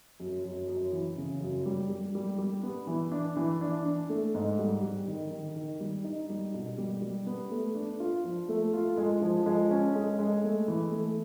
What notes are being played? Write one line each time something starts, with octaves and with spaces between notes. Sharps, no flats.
F#2
F#2
F#2
E3
C#3
F#2
G3
G3
G3
G3
B3
E3
D4
E3
D4
D4
A3
G#2
G3
G3
D#3
D#3
D#3
G3
D#4
G3
B2
G3
G3
B3
A3
D4
F4
F3
A3
F4
G#3
F3
G#3
C#4
G#3
G#3
A3
E3
A3